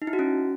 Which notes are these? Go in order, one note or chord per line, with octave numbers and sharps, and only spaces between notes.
D#4
E4
F#4
C#4